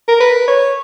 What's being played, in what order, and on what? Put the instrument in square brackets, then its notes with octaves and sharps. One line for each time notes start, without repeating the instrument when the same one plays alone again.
[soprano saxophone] A#4
B4
C#5